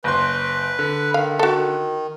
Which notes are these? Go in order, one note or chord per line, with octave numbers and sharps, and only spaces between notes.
F#1 B4 C6
D3
D#3 F5
F#4 A4